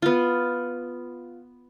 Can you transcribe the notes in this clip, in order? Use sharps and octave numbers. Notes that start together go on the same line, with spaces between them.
B3 F4